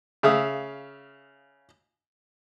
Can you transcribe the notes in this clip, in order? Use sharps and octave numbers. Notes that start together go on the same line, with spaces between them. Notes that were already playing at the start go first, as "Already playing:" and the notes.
C#3 E5 F5 D#6